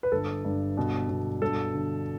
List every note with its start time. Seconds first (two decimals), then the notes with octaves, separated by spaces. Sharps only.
0.03 B4
0.12 G1 A4
0.45 G2
0.77 B2
1.09 B2
1.42 G2 A4
1.74 D3